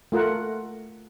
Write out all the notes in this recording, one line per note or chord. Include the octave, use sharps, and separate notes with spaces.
A3 F4 A#4 F#5